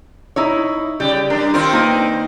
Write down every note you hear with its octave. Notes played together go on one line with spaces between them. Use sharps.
D#4 E4 C#5
C#3 G3 G4
G3 D4 A#4
D#3 C4 F4 A#4
A#3 D#4 B4